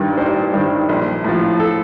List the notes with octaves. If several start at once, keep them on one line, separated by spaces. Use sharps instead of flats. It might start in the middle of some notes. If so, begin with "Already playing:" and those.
Already playing: A1 G2 D#3 G3 D5
A1 C5
G2 D#3 G3
A#1
A2 F3
A4